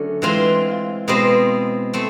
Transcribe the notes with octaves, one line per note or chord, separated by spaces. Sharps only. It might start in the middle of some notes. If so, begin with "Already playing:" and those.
Already playing: D3 F#3 A3 C#4
E3 G#3 C4 F4
B2 G#3 C4
A3 C4